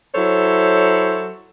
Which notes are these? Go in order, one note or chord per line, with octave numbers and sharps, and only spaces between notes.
F#3 E4 A4 C5 C#5